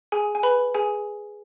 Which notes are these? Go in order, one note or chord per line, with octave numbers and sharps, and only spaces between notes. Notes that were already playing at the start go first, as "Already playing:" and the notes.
G#4 G#5
G#5
B4 B5
G#4 G#5